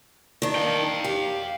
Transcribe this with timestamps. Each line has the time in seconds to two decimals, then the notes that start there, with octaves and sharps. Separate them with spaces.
0.42 D#3 D4
0.55 F5 G5
1.04 G4